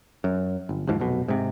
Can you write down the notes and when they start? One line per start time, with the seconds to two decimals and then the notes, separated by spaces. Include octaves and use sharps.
0.24 F#2
0.69 G1
0.87 F#1 D#2 G#2 F3
1.00 F1 B1 B2
1.28 G#2 C3